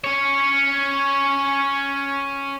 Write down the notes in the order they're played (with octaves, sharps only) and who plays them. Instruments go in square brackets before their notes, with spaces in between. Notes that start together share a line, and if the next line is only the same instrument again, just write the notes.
[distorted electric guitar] C#4 C#5